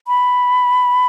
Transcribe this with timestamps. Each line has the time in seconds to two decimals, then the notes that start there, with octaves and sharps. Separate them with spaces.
0.08 B5